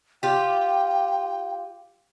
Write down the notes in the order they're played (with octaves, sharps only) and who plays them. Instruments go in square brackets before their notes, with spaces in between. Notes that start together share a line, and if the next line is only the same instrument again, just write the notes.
[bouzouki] F4 G4 [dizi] G5